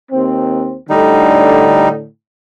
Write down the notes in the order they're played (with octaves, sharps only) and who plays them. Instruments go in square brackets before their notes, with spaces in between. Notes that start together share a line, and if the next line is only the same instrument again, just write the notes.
[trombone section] D#2 C4
[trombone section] A2 D3 [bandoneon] G3 D#4